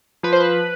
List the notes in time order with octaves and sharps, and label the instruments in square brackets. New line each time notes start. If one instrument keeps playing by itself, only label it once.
[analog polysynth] F3 B4
C5
B4